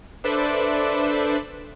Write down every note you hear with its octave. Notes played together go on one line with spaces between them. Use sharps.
D4 A4 B4 C5 D5 E5